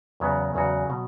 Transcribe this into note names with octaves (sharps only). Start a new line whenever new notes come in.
E2 C#3 F#3 B3 F#4
E2 C#3 F#3 B3 F#4
B2 F#3